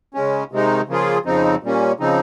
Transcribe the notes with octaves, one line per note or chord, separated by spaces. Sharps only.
C#3 G#3 C#4
C3 D#3 G#3 D#4
C#3 F3 A#3 F4 G#4
F2 C#3 F3 C4 D#4
A#2 G3 A#3 C#4
C#3 F3 C4 D#4